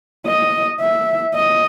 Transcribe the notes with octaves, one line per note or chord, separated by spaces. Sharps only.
D#5
E5
D#5